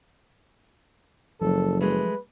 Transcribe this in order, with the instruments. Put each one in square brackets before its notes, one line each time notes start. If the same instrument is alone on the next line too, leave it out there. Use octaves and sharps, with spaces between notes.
[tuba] F#1 [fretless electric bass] F3 F#3 [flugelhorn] A4
[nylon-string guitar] G#3 A3 [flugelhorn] B4